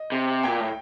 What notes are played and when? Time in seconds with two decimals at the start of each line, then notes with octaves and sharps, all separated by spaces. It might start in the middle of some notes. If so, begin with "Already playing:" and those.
Already playing: D#5
0.12 C3
0.43 A#2 G5
0.60 A2